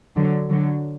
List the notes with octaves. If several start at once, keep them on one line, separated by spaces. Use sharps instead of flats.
D3 F#3
D3 F#3